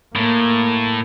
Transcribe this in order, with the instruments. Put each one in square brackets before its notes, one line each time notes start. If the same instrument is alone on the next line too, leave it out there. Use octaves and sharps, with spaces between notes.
[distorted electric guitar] A2 [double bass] A#3